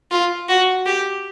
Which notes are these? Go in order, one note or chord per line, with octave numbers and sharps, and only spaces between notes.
F4
F#4
G4